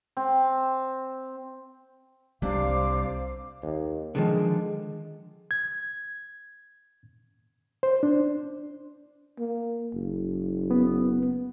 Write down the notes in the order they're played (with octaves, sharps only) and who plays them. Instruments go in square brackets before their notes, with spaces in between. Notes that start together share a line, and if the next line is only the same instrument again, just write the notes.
[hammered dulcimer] C4
[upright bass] C2 [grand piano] C3 D4 [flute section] C5 F5 D6
[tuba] D#2
[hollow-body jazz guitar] D3 D#3 F3 [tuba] G#3
[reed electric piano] G#6
C5
D4
[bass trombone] A#3
F#1
[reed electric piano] B3